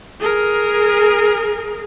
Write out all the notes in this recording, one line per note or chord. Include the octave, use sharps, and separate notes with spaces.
G#4 A#4